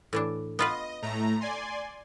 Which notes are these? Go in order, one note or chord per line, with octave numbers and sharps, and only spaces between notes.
A2 E3 D4
B3 F4 B4 D#5
A2 A3 A#5
D5 G#5 C6